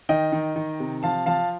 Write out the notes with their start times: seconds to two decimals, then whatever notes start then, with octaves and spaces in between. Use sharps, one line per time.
0.09 D#3 D#5 G5
0.32 D#3
0.56 D#3
0.80 C3
1.03 F3 F5 A5
1.26 F3 F5 A5